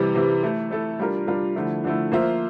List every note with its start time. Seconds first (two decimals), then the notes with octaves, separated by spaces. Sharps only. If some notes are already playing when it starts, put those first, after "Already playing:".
Already playing: C3 E3 G3
0.15 C3 E3 G3
0.43 A3 E4 A4
0.71 A3 E4 A4
0.99 G3 D4 F4 A#4
1.27 G3 D4 F4 A#4
1.56 D3 F3 A3 E4
1.84 D3 F3 A3 E4
2.12 F3 A#3 F4 C5 E5